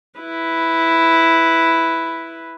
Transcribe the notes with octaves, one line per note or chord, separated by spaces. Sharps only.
E4 B4